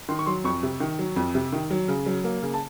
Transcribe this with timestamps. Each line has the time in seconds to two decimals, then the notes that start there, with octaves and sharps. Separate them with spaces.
0.09 D#3 C6
0.19 C#6
0.26 F#3 C6
0.44 F2 C#6
0.63 C3
0.80 D#3
0.99 F#3
1.16 F2
1.35 C3
1.52 D#3
1.71 F#3
1.88 C#3
2.06 F#3
2.24 A#3
2.42 C#3
2.54 A5